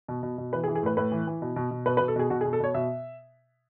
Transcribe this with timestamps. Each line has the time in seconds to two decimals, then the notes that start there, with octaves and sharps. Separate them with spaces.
0.08 B2
0.23 B2
0.38 B2
0.53 E3 B4
0.64 G#4
0.68 E3
0.75 G#4
0.82 A2 B4
0.97 A2 B4
1.12 E3
1.27 E3
1.42 B2
1.56 B2
1.71 B2
1.86 B2 B4
1.97 B4
2.00 B2
2.08 A4
2.16 B2 G#4
2.30 B2 F#4
2.41 G#4
2.45 B2
2.53 A4
2.60 B2 C#5
2.74 B2 E5